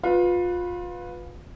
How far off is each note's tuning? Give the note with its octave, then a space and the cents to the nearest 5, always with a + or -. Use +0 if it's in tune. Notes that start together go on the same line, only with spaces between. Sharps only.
F4 +25 B4 +0